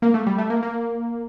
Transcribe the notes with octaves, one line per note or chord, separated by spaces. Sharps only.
A#3
A3
G3
A3
A#3
A#3